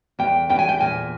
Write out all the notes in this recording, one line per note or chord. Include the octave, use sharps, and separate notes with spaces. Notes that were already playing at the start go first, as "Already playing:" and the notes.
E2 G5
E2 G5
G#5
G5
A#2 G#5